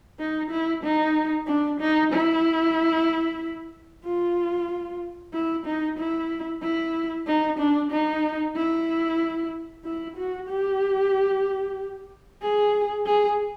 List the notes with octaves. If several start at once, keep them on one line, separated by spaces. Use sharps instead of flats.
D#4
E4
D#4
D4
D#4
E4
F4
E4
D#4
E4
E4
D#4
D4
D#4
E4
E4
F#4
G4
G#4
G#4